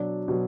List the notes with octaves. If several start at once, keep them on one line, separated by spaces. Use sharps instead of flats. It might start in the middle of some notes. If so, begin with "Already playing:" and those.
Already playing: B2 F#3 D4 D5
B2 F#3